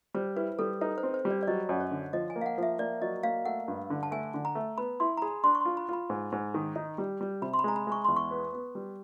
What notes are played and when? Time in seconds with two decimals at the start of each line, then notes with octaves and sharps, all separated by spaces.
0.14 G3 C5
0.36 E4 B4
0.59 G3 A4
0.81 D#4 B4
0.98 C5
1.03 C4
1.14 C5
1.25 G3
1.31 D5
1.43 D5
1.47 F#3 D#5
1.69 F#2
1.80 C#5
1.91 D3
2.13 F3 D#5
2.30 G#5
2.36 A#3
2.41 F5
2.46 F#5
2.58 F3 E5
2.79 A#3 D5
3.02 F#3 D#5
3.23 A#3 F5
3.45 A3 F#5
3.68 G2
3.90 D3
4.03 A5
4.11 A3 G#5
4.34 D3
4.45 A#5
4.55 A3
4.78 B3 B5
5.00 E4 C6
5.17 A#5
5.22 G#4 B5
5.44 D4 C6
5.55 C#6
5.61 F4 C6
5.77 B5
5.89 F4 B5
6.10 G#2
6.32 G#2
6.54 D#3
6.76 D#4
6.98 G3
7.21 G3
7.42 C3 B5
7.54 C6
7.59 B5
7.64 G#3 A#5
7.76 B5
7.87 G#3 C#6
8.04 E2 C6
8.16 C#6
8.31 B3
8.53 B3
8.75 G3